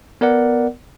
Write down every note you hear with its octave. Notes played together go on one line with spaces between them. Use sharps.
B3 A#4 D5 F#5